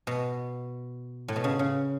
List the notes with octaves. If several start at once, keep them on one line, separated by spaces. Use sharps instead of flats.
B2
A2
B2
C#3
C#3